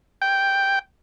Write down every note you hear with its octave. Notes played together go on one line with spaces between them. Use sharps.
G5